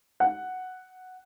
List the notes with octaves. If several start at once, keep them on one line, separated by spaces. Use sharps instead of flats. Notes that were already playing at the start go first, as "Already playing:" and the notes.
F#5